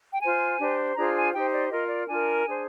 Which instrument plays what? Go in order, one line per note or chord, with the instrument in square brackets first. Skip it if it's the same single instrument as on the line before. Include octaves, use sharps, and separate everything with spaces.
[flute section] G5
F4 C5 G#5
D4 G4 C5
D4 F4 G#4 C5 A#5
G#5
D#4 G4 C5 G5
D5
F4 A#4 D#5
D5
D4 F4 A#4 G#5
D4 G#4 C5